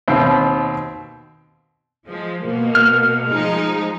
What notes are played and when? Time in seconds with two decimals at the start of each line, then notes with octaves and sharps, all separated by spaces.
0.08 D#2 B2 C4
2.07 F3 G#3
2.44 B2 A#3
2.75 F6
3.30 F3 G#3 D#4